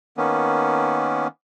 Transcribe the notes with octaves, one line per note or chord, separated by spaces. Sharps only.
D#3 A#3 B3 C#4